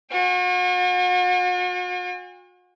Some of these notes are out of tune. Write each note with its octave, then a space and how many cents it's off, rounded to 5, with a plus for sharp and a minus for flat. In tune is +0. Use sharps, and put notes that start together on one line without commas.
F#4 -40 G#5 -45